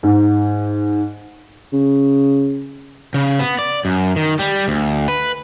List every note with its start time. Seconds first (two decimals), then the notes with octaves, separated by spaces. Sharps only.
0.03 G#2
1.73 C#3
3.14 C#3
3.39 B3
3.59 D5
3.85 F#2
4.16 D#3
4.39 G3
4.68 D2
5.08 B4